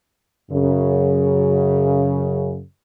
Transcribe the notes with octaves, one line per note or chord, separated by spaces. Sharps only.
F#2 C#3